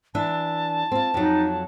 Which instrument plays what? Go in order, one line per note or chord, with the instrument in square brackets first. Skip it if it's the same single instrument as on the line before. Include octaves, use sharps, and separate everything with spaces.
[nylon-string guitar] E3 D4 E5 [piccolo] A5
[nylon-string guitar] C4 F4
[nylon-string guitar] F2 F#3 [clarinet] D#4